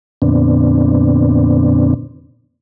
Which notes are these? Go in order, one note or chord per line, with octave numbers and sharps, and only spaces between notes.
F2 A#2 D3 B3 C4 D4